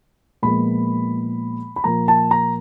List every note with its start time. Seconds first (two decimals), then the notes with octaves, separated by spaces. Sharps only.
0.42 A#2 F3 G#3 B3 B5
1.76 B5
1.84 A#2 F3 A#3 A#5
2.08 A5
2.31 A#5